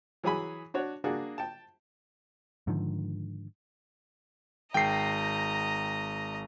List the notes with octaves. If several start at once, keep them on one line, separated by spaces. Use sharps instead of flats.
E3 F#3 G#4 G#5 B5
D4 F#4 C#5
A#3 D4 F#4 G#4
G5 A5
G#2 D3 D#3 F3
G#1 D#5 G5 A#5 C7